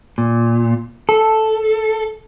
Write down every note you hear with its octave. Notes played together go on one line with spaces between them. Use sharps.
A#2
A4